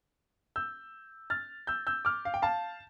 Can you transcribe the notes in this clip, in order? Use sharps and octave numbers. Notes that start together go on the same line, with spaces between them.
E6 G6
F6 A6
E6 G6
E6 G6
D6 F6
F5
G5
F5 A5